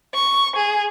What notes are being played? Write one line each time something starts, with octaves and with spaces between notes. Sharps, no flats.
C#6
G#4